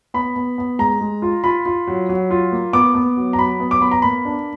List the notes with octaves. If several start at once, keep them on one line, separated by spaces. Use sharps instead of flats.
B3 B5
B3
B3
G#3 A#5
G#3
F4
F4 B5
F4
F#3
F#3
F4
A#3
B3 D6
B3
F#3
A#5
F#3 B5
B3
D6
B3 B5
A#5
A#3 B5
D4